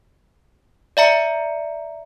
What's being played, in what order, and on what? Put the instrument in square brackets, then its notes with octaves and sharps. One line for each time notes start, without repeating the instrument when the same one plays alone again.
[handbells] D5 E5 A#5 C#7